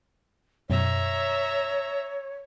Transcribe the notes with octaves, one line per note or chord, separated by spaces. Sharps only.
F#2 B2 C#5 E5 A#5